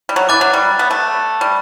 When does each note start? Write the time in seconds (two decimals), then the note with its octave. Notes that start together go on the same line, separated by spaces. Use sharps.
0.09 G3
0.16 F#3
0.29 E3 D6 F#6 A6
0.41 F#3
0.53 G3
0.79 B3
0.91 A3
1.41 G3